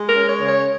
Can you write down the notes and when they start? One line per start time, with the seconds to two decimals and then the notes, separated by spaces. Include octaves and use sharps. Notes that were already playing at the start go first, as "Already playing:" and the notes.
Already playing: G#3
0.09 A#4
0.15 C#4
0.28 C#5
0.42 C#3
0.48 C#5